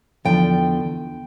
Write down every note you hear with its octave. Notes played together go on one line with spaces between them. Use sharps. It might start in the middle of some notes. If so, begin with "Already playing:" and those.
E2 D3 F3 G5